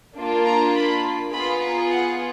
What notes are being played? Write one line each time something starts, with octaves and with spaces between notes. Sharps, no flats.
A#3 D4 F4
A#5
B5
B3 F4 G#4 B5
A#5
F#5